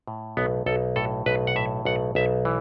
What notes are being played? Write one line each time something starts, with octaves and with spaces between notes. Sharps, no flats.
A2
B1 B3
B1 A4
A2 A4
B1 B4
F#5
A2 E5
B1 F#5
B1 E5
E3